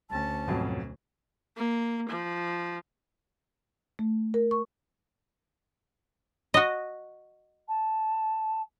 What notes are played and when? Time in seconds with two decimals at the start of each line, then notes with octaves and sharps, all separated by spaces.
0.10 D2 C#4 A5
0.48 F2 G#2 B2 F#3 F4
1.57 A#3
2.09 F3
3.99 A3
4.34 A#4
4.51 C#6
6.54 F#4 D#5
7.68 A5